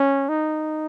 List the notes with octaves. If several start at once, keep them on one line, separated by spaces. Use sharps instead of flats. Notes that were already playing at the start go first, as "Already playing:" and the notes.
Already playing: C#4
D#4